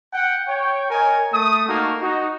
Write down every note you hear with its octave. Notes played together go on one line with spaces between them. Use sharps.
F#5 G5
C#5 G5
A#4 C#5 D#5 G#5
A3 D#6
A3 A#3 D#4 F#4
D#4 F#4